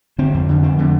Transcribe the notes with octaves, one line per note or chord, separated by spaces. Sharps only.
D3 C4
F2
D3
F2 C4
D3 A3